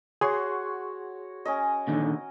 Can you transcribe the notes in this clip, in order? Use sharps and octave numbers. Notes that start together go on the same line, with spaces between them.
F#4 G#4 C#5 F#5 C6
C#4 A#4 D#5
A#2 D3 D#3